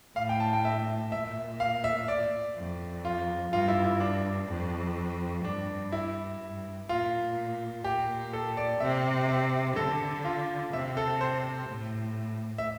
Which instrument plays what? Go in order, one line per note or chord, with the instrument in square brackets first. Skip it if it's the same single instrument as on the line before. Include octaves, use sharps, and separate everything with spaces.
[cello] A2 [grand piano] F5
[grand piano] G5
A5
G5
E5
[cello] A#2 [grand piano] E5
[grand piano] F5
E5
D5
[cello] F2
[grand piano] F4
[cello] G2 [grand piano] F4
[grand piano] E4
E4
D4
[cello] F2
[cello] G2 [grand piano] D4
[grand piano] E4
[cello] G2
[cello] A#2 [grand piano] F4
[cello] A#2 [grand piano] G4
[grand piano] A4
D5
[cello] C3 [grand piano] E5
[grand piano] E5
[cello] D3 [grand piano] A4
[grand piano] F4
[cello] C3 [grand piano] E5
[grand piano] A4
C5
[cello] A2
[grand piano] E5